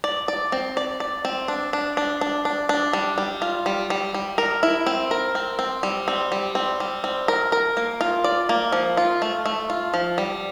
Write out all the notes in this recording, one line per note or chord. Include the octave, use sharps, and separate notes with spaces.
D5
D5
C4
D5
D5
C4
D4
D4
D4
D4
D4
D4
G3
G3
F4
G3
G3
G3
A#4
E4
C4
A#4
C4
C4
G3
C4
G3
C4
G3
C4
A#4
A#4
A#3
F4
D5
A#3
F3
F4
A3
A3
F4
F3
G3